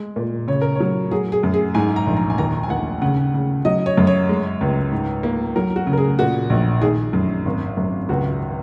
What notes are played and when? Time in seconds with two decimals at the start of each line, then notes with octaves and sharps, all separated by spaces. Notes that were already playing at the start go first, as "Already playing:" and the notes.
Already playing: G#3
0.16 A#2
0.48 C#3 C#5
0.62 A#4
0.75 F#3 C#5
1.11 F#3 G#4
1.32 G#4
1.43 F#2
1.54 G#4
1.74 G#2 G#5
1.96 A#5
2.07 A#1
2.17 A#5
2.30 G#5
2.38 D#2 A#5
2.63 G#5
2.70 D#2 F#5
3.02 C#3 F#5
3.34 C#3
3.65 F#3 D#5
3.86 C#5
3.97 F#2
4.07 C#5
4.29 G#3
4.61 C#2
4.91 G#2
5.23 A#3
5.56 F#3 A#4
5.76 F#4
5.87 C#3
5.93 A#4
5.98 G#4
6.19 A#2 F#4
6.50 A#1
6.82 D#3 G#4
7.13 F#2
7.46 G#1
7.77 F#2
8.09 C#2 F#4